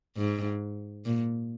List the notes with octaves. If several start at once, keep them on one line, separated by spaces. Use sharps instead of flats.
G#2
A#2